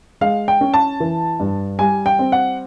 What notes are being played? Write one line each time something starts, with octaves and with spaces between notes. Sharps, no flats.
G#3 F5
G5
C#4
A5
E3
G2
G3 G#5
G5
C4
F#5